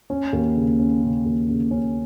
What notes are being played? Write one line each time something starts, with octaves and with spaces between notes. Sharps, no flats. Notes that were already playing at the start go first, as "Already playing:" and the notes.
C#4
D#2
C#3
C#4
C#3
D#2
C#3
C#4